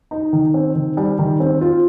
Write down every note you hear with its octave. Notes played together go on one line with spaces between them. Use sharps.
D#4
D#3
C4
D#3
G3
D#3
C4
F4